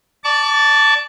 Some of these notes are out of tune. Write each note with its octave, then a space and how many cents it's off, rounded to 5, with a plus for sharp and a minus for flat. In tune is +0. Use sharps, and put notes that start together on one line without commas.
D5 +0 A5 +0 C#6 +45